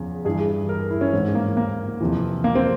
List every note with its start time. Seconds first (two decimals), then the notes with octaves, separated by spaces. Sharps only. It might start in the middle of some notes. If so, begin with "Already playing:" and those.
Already playing: E2 C#3 F3
0.25 G2 E3 G#4
0.69 A#4
0.91 E4
1.01 C#4
1.13 G#2 E3 C4
1.35 A#3
1.57 A#3
2.01 F2 C3 E3
2.44 A#3
2.55 C4